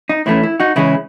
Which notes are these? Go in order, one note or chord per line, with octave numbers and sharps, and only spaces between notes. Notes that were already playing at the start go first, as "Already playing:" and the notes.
D#4
A2 E3 A3 C#4 E4
E4
D#4 F#4
C#3 E3 G#3 C#4 E4